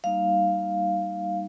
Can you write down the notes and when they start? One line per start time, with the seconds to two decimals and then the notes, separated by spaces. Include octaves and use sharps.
0.04 G3 A#3 D#4 F5